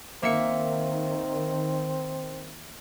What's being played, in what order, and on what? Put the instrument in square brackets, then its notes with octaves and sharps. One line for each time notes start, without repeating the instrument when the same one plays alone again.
[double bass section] D#3 [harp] A#3 E5 C#7 [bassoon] C4